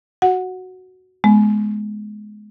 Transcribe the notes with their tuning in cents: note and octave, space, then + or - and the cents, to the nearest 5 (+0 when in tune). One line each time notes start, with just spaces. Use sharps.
F#4 +0 F#5 -10
G#3 +20 B3 +0